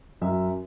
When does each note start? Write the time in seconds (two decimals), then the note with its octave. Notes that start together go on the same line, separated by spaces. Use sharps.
0.21 F#2 E5